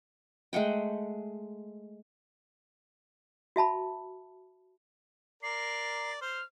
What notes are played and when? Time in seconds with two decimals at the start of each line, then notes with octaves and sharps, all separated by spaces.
0.53 G#3 A3 F#5 G5
3.56 F#4 E5 A5 B5
5.43 A#4 D5 C7
6.21 C5 F6